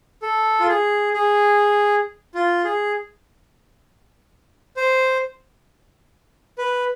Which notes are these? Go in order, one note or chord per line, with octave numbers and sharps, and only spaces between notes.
A4
F4
G#4
G#4
F4
G#4
C5
B4